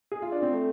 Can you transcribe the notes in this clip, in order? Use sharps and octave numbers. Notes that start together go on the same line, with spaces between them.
G#4
F4
D4
C4
A3